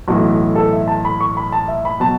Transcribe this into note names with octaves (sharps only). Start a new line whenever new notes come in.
B1 A2 E3 F#4
A4
E5
A5
B5
C#6
B5
A5
E5
B5
B2 F#3 A5